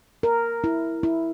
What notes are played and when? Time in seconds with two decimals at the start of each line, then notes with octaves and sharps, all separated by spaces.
0.23 A#4
0.64 E4
1.03 E4